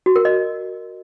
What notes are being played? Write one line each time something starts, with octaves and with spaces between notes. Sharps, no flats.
F#4
A#4
D#5